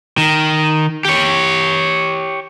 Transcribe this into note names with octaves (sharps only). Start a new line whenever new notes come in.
D#3
G4 C#5